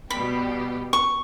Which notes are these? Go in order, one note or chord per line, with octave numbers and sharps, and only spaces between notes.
B2 G3 B3 G4 B5
C#6